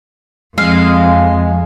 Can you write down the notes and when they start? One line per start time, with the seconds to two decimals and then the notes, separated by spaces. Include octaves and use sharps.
0.58 F2 G#3 F5